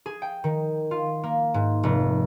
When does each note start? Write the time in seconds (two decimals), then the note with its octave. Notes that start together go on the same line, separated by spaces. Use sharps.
0.06 G#4
0.22 G5
0.44 D#3
0.91 F4
1.24 A#3
1.54 G#2
1.83 F1